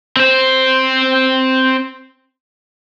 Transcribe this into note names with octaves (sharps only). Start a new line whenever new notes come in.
C4 C5